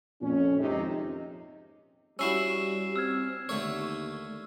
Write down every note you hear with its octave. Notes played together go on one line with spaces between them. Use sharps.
F2 A#2 C#4
G#1 F2 C3 D#4
G3 C#4 E4 F#4 E6 C7 E7
C4 E6 F6 G#6
D#2 D3 A3 C#5 E6